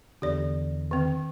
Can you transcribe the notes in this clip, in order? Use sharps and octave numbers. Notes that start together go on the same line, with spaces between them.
E2 D3 G4 D5
D#3 C4